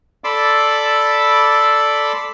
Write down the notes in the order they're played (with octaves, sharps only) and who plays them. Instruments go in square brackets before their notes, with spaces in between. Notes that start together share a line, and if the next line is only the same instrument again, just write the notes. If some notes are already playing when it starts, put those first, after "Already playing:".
[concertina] A4 D5 B5 C6 D6 E6